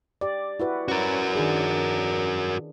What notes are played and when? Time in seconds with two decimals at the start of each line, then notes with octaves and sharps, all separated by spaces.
0.21 G4 D5
0.60 E4 F#4 B4
0.88 C#4 F#4 A#4
1.35 D#3 D4 G#4